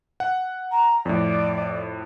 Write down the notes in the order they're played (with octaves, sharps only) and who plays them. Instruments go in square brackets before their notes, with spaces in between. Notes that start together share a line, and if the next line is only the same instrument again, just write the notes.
[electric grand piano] F#5
[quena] A#5
[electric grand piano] F2 A2 [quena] D5